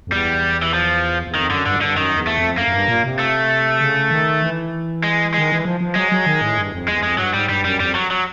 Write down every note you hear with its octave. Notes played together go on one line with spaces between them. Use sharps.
F2
E2 G3
E3
F3
E2
F2 D#3
F#2 D3
G2 D3
F#2
G2 D3
F#2 D#3
E2
A3
F2
F#2 A#3
F#2
G2
A#2
C3
A3
C#3
D#3
E3
G#3
D#3 G#3
E3
F3
F3
F#3 G#3
F#3
D#3
A2
G2
F2
E2 G#3
F2 G#3
G2 F#3
G#2 G3
G2 G3
F#2 G3
F2 G3
F#3
F#3